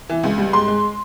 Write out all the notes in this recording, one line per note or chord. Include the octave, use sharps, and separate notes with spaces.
E3
C#2
G3
G#2 C6
G#3